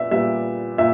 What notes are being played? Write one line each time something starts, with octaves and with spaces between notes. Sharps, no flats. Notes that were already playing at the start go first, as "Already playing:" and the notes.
Already playing: A#2 B3 D5 E5
A#2 G3 B3 E5
A#2 E5